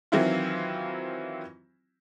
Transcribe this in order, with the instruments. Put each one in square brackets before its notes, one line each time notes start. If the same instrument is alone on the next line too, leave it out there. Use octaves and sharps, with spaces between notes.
[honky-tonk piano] D#3 E3 F#3 C4 E4 F4